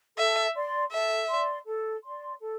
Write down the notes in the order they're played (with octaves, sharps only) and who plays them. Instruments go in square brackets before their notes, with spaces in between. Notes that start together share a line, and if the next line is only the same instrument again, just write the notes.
[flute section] A4 [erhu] E5
[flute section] D5 C6
[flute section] A4 [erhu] E5
[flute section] D5 C6
A4
D5 C6
A4